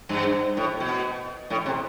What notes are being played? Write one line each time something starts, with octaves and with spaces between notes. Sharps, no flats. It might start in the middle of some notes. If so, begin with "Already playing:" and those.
G2
A2
B2
A2
C3